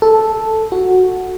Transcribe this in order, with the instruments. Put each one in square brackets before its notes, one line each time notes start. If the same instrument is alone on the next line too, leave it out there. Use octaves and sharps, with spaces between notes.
[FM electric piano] A4
F#4